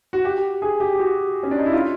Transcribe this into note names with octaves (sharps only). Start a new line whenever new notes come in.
F#4
G4
G#4
G4
G4
F#4
C#4
D4
D#4
E4
F4